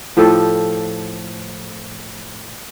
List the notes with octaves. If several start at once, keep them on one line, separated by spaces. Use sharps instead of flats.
A2 F3 G4 A4